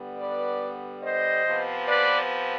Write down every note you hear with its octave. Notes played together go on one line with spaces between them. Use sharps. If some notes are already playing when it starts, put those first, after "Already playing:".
Already playing: D3 G3 B3
B4 D5
C5 D#5
C3 F3 B3
B4 D5